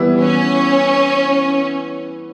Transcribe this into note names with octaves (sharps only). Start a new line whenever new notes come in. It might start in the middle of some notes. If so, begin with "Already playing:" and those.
Already playing: E3 G3 B3 E4
C#4